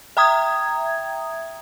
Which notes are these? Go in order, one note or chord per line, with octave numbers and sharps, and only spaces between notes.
E5 G5 A#5 D#6 G#6